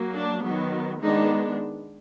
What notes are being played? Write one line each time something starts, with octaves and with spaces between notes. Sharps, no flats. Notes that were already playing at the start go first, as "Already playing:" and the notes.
Already playing: F#3 A#3
D4
D#3 F#3 B3
D#3 G#3 B3 D4 D#4